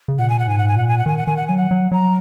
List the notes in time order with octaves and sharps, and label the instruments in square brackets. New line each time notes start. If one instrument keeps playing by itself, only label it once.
[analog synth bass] C#3
[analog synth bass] A#2 [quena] F#5
[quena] G#5
F#5
[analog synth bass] G#2 [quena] G#5
[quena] F#5
G#5
[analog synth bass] A#2 [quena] F#5
[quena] G#5
F#5
[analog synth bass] D#3 [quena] G#5
[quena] F#5
[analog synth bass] D#3 [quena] G#5
[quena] F#5
[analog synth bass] F#3 [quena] G#5
[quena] F#5
[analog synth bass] F#3
[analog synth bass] F#3 [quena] A#5